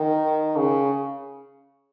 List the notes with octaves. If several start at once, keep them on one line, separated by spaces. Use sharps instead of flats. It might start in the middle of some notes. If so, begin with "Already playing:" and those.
Already playing: D#3
C#3